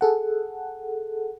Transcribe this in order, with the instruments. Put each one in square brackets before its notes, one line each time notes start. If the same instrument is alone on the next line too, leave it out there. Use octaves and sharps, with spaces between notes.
[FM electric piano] G#4 A4 F#5